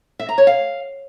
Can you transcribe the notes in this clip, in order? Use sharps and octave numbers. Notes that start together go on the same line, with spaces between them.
E5
A#5
C#5
F5